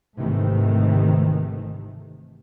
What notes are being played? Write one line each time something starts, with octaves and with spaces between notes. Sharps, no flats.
G#1 G#2 C3 D#3 E3 A3